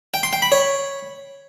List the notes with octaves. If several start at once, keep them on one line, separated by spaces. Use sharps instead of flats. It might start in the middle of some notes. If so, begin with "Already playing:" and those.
G5
C6
G5
B5
C#5